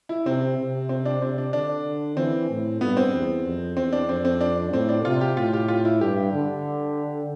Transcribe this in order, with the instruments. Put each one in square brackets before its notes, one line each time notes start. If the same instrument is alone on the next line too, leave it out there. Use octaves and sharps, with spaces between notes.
[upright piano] E4
[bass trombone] C3 [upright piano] C4
[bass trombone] C3
[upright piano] C4
D4
[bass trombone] C3 [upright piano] C4
[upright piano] D4
[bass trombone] D3 [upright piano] D4
[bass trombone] E3 [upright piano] C4
[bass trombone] A2
[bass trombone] G2 [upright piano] B3
[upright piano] C4
[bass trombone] E2
F2
[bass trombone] E2 [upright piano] C4
[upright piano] D4
[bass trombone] F2 [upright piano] C4
[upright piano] C4
D4
[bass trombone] A2 [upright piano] C4
[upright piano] D4
[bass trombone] C3 [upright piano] F4
[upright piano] G4
[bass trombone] A2 [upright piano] F4
[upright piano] G4
F4
E4
[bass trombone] G2 [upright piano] G4
[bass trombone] D3